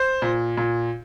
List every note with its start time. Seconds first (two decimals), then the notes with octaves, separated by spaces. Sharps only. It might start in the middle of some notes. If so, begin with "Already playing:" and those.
Already playing: C5
0.22 A#2
0.57 A#2